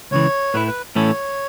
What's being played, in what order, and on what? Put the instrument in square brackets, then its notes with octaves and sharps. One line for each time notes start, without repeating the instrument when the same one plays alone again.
[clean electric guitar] C#2 C#3 E3 [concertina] C#5
[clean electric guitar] A2 A3 E4 [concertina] B4
[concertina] B4
[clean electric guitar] A2 E3 A3 C#4 A4 [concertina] C#5